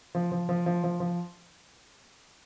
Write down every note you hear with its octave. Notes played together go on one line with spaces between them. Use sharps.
F3
F3
F3
F3
F3
F3